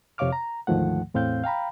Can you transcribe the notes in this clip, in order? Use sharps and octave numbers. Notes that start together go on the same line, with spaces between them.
F2 C3 C#5 F5 D6 F6
A#5
D2 G#2 D#3 F3 A3 F#5
E2 A2 C4 F5 G6
F5 G5 A#5 B5